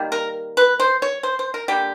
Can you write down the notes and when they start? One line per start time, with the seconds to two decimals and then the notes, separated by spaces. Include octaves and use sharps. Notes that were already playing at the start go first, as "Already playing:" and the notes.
Already playing: D#3 G3 A#3
0.12 A#4
0.57 B4
0.80 C5
1.02 C#5
1.23 C5
1.39 C5
1.54 A#4
1.68 D3 G3 A#3 G4